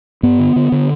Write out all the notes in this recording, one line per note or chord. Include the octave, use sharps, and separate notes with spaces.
G2 B3
D3
D3
D3